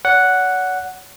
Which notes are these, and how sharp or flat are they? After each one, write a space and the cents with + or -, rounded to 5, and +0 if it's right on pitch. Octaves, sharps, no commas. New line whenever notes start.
C#5 +45 F#5 +0